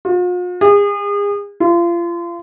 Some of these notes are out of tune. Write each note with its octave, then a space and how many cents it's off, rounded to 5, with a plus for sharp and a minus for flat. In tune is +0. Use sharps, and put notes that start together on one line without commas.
F4 +45
G#4 -35
F4 -30